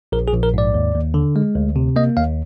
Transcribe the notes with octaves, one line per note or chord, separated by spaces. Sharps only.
A#1 A#4
G#4
A#1
A#4
G#2 D5
D#2
D#2
D3
G#3
D2
C3
A#3 D#5
D#2 F5